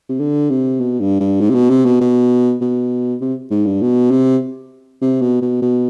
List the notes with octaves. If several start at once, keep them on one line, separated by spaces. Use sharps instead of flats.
C3
D3
C3
B2
G2
G2
G#2
C3
B2
C3
B2
B2
B2
C3
G#2
G2
B2
C3
C3
B2
B2
B2